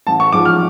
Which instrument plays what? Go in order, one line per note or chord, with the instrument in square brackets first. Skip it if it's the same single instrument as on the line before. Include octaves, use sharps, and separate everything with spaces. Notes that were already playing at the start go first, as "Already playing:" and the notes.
[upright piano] A1 A5
C#6
G#2 F3 D6
F6